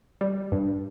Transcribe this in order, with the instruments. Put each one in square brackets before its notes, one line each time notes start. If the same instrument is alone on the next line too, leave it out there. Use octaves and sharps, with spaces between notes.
[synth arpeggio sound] G3
G2